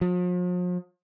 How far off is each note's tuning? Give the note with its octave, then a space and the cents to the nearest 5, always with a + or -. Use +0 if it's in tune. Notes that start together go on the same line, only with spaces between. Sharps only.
F3 +45